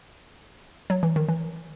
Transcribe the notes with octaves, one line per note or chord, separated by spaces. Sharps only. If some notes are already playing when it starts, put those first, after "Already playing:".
F#3
E3
D#3
E3